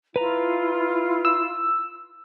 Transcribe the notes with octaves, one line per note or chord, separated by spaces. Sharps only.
E4 F4 B4 A#5
E6